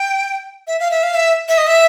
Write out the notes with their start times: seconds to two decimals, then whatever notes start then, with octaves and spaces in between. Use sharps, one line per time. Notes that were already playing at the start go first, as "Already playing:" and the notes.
Already playing: G5
0.67 E5
0.80 F5
0.91 E5
1.03 F5
1.15 E5
1.48 E5
1.58 D#5
1.67 E5